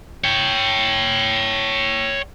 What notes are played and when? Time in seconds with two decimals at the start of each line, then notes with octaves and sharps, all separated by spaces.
0.24 C#5 G5